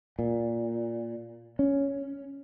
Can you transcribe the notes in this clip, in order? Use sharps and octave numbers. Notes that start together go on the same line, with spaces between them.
A#2
C#4